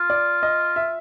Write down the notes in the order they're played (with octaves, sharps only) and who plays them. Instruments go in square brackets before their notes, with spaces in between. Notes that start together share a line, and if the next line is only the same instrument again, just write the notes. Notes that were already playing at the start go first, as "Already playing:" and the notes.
Already playing: [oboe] F4
[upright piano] D5
D#5
E5